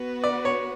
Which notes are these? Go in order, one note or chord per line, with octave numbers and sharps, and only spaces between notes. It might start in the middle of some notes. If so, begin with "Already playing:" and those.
Already playing: B3 F#4 B4
D5
C#5